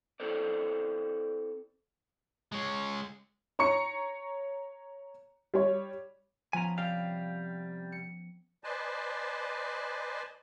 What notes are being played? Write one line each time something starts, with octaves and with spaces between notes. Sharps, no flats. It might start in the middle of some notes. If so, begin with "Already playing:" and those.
C4 E4 A4 A#4 C5 D5
G#3 C#5
C#5 A#5 C#6 C#7
G3 C#5
F3 B3 C#4 G#5 A#5
C3 G3 F5 G5
C#7
B4 C5 D5 D#5 G#5 A5